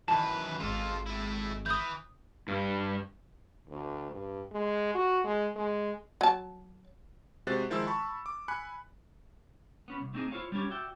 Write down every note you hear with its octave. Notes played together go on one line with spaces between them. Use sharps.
F#2 D#3 E3 B4 A5
G#1 G#3 F4 A4
A3 E4
E3 D#6 G6
G2
D2
G2
G#3
F#4
G#3
G#3
F#3 A5
C3 G#3 F#4 C5 F#6 A6
D#3 F3 G#3 E4 C6 E6
A5 B5 C#6
D6
G#5 B5 F#6 C#7
B3 C#4 B5
C2
A3 C4 D4 D#4 F#4 G#4
E4 F4 G#4 C5 C#5 F5
G3 C#4 D4 G4 C#5
F#4 D5 E5 G5